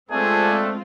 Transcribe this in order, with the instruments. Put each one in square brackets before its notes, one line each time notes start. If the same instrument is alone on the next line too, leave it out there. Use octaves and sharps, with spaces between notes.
[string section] G#3 C4 F4 [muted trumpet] A3 [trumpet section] D4 A4 [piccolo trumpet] G#4